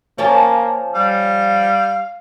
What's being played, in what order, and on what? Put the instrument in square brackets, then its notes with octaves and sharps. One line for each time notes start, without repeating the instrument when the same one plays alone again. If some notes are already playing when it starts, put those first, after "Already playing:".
[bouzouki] F3 C#4 A5 [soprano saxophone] A#3
[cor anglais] G3 [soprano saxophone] F5